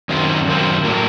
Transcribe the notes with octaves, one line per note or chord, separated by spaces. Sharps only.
F#2 D#3 F#3 C4 F4
F#2 D#3 F#3 C4 F4
A2 F#3 A#3